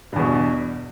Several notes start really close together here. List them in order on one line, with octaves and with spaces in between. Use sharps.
G2 E2 B2